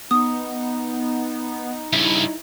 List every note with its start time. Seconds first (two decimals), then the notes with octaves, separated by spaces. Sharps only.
0.11 B3 D#4 D#6
1.93 G2 C#3 E4 E5